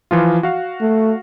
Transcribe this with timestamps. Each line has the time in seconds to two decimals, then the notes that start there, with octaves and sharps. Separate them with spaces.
0.11 E3 F3 F4
0.43 F#4 F5
0.81 A3